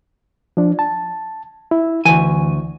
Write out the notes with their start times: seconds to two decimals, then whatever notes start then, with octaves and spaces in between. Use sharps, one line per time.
0.57 F3 D4
0.79 A5
1.71 E4
2.05 D2 E3 G#5